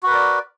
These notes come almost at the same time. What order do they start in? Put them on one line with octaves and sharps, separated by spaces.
F#4 B4 A#4 D5